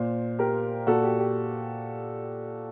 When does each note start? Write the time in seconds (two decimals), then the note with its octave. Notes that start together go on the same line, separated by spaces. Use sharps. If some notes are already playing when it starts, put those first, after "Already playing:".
Already playing: A#2 C5
0.39 G4 A#4
0.87 A#2 F#4 A4
1.04 G4
1.19 G4